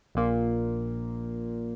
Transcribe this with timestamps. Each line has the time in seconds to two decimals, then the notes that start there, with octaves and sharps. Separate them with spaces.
0.15 A#1 A#2 A#3